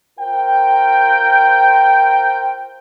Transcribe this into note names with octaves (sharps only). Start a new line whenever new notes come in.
F4 A#4 C5 G5